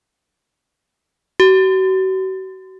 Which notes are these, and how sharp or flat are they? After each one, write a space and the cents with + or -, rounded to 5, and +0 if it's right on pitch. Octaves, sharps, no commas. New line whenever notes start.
F#4 +40